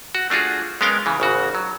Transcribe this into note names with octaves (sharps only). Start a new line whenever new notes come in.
F#4
A3 D4 F4 F#4 G#4
G#3 B3 C#4 A#4 F5 G5
C#3 E3
G#1 C#3 F#4
F#3